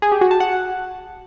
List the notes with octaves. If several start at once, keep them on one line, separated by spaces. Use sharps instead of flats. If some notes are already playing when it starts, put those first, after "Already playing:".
G#4
G4
F#4
A5
F#5